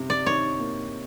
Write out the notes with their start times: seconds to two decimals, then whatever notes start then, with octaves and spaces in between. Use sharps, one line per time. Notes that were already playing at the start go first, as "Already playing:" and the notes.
Already playing: C3 G3
0.10 D5
0.26 D#3 C#5
0.59 A#3